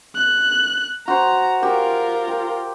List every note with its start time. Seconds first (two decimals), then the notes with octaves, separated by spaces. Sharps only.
0.16 F#6
1.08 F#4 C5 A#5
1.63 F4 G4 A#4
2.28 G5